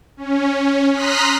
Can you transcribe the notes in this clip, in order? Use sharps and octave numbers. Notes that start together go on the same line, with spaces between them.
C#4
A#5 C6 D#6 F6 F#6 B6